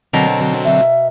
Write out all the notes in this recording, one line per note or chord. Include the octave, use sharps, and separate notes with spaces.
B2 D3 F#3 C4 A#4
E5